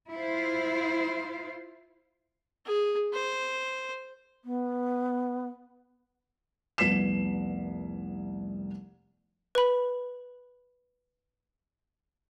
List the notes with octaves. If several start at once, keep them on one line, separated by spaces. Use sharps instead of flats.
E4 F4 C5
G#4
C5
B3
F1 C2 B3 B6 C7 E7
B4 B5